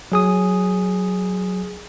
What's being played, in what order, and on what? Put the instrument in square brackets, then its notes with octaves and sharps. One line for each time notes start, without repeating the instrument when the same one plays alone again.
[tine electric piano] F#3 G#4 D#6